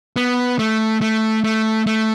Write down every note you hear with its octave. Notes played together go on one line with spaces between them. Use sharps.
B3
A3
A3
A3
A3